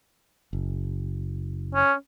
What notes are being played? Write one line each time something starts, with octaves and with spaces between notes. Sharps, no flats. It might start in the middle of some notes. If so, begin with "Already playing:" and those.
F#1
C#4